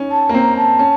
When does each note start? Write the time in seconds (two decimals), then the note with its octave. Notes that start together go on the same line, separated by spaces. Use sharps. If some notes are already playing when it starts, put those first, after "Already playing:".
Already playing: C#4 D#4
0.11 A5
0.29 A#3
0.34 C4 A#5
0.57 A5
0.79 C#4